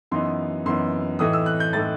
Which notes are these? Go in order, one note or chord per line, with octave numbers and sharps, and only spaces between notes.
F#2 E3 B3 D#4 C6
F#2 E3 B3 D#4 C6
A2 E3 A3 D#4 D#6
E6
F#6
G6
A2 E3 A3 D#4 A6